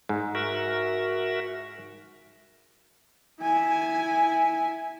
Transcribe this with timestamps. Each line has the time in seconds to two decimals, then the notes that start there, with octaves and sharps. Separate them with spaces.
0.09 G#2
0.35 F#4 A#4 E5
3.42 E4 G#5